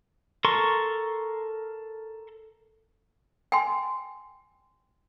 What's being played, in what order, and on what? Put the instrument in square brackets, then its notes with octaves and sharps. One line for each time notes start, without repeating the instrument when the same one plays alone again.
[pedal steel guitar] A4 A#4 C6 C#6
[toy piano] G5 G#5 C6